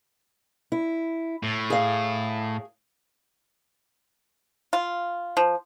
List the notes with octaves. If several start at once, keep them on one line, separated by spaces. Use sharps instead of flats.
E4
A2
G#4 F5
F4
F3